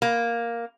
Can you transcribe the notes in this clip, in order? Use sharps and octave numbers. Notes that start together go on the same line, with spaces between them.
A#3